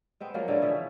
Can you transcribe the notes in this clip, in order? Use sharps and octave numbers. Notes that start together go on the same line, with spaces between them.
G#3 B3 C4
F3 F#3 G#3 A#3
D3 G#3 C#4 E4
B2 E3 F3 E5